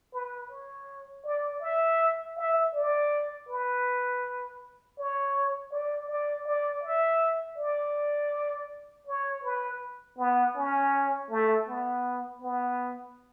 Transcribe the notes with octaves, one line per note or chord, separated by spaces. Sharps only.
B4
C#5
D5
E5
E5
D5
B4
C#5
D5
D5
D5
E5
D5
C#5
B4
B3
C#4
A3
B3
B3